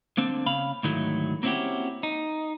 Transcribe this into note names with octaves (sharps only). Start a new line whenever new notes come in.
D3 A#3 C4 D4
C#3 F5 B5
D2 G#2 D#3 F#3 A3 E4
A#3 C4 C#4 E4 F#4 G4
D#4